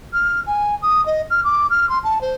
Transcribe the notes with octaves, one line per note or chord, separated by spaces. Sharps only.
F6
G#5
D#6
D#5
F6
D6
F6
C6
A5
C5